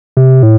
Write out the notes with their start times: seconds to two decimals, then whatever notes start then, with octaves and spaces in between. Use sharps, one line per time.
0.17 C3
0.43 A2